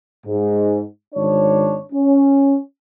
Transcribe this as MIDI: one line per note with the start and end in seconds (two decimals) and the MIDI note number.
0.26 0.82 44
1.15 1.78 32
1.15 1.78 62
1.15 1.78 73
1.92 2.57 61